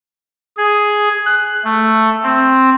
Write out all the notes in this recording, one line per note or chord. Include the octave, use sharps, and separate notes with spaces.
G#4
F#6
A3
C4